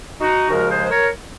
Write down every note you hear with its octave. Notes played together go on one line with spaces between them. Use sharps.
D#4 F#4
D#2 C#3 F3 G#3 F#4 A#4
G#4 C5
C5
A#4 C#5